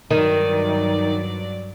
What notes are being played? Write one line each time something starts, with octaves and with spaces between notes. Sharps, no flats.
G2 D#3 F#3 D5